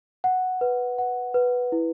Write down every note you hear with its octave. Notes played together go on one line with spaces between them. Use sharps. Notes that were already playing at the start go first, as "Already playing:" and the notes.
F#5
B4
F#5
B4
E4